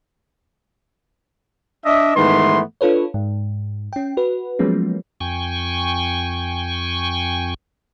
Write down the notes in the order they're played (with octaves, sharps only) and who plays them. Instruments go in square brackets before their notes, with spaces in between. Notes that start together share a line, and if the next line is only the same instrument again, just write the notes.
[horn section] D4 D#5 E5
G#2 D#3 E3 A3 B3 C6
[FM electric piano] D4 F4 A4 B4 C#5
G#2
C#4 G5
F#4 B4
F3 F#3 G#3 A#3 B3 C#4
[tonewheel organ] F2 G5 G#5 C#6